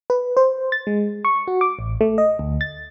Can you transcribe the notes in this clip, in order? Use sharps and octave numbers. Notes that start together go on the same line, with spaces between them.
B4
C5
A6
G#3
C#6
F#4
D6
A1
A3
D#5
D2
A6